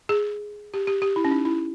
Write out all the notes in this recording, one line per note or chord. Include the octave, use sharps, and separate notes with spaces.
G#4
G4
G4
G4
E4
C#4
D#4
E4